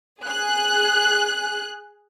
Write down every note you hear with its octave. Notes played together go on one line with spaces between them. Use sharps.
G#4 F#6